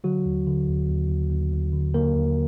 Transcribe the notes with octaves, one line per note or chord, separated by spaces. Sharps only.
D3 F#3 F#4
D#2
D3
D#2
D#2
D#2
D#2
D#2
D3
D3 A#3 A#4
D#2